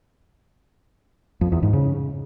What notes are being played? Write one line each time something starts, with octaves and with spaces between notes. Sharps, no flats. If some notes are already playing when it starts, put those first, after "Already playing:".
F2
E2
G#2
C#3